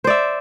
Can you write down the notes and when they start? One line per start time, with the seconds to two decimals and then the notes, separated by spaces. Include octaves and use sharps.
0.04 C5
0.07 D5
0.10 E5